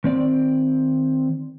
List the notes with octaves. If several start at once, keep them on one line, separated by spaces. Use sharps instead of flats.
D#3 C4 D5